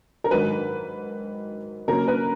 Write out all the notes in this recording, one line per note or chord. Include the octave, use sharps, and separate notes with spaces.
A#4
G#2 D#3 F#3 B4
C#3 F#3 A#3 A#4
B4